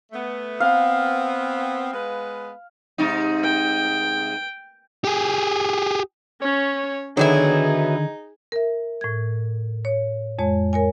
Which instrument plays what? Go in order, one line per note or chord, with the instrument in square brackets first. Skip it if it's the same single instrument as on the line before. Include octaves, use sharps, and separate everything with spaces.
[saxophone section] A3 B3
[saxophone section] B3 C4 [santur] F5
[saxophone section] G#3 B3 B4
[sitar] G#2 C3 D#4
[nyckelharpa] G5
[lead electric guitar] G4 G#4
[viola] C#4 [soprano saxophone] C#5
[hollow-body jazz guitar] D3 D#3 [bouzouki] F#3 B3 E4 [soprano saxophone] D#4 [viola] G#4
[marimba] A#4 E5
A2 G#6
C#5
F2 G#3 C#5
A#4 C#5 G#5